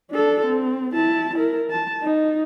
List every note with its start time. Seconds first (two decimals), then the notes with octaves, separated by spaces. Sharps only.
0.11 D4 A4
0.46 C4
0.94 E4 A5
1.36 E4 A#4
1.71 A5
2.02 D#4